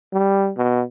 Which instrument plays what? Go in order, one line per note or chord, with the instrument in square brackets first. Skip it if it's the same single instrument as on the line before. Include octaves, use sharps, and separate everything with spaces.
[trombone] G3
B2